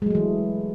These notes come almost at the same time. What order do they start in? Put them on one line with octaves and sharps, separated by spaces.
G#3 F#3 A3 E3